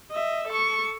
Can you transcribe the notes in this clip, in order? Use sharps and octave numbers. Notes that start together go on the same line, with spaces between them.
D#5 E5
A4 C#6